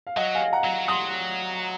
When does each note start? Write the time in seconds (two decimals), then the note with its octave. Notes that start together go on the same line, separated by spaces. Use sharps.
0.07 F5
0.16 F#3 D#5 F#5
0.35 F5 G#5
0.53 F#5 A#5
0.65 F#3
0.88 F#3 C6 D#6